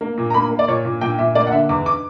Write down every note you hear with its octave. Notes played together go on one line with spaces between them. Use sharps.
A#3
A#2
A#5
A#3 B5
A#3
D5
A#2 C#5
A#2
A#2 G5
A#2 E5
A#3 D5
F#5
D3 E5
E2 D6
D6